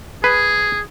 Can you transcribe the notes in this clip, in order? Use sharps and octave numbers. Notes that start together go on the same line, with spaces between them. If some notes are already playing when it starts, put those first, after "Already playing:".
G#4 B4